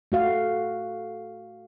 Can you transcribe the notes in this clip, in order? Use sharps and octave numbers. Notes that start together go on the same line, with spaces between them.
A3 F#4 F5